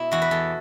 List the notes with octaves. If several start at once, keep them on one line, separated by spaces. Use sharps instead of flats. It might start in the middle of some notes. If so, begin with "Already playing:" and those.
Already playing: B2 E4
E2 F#4
B4
E2 A4